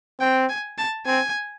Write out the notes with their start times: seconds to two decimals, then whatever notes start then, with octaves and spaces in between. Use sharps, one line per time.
0.20 C4 G5
0.49 G#5
0.78 A5
1.06 C4 G#5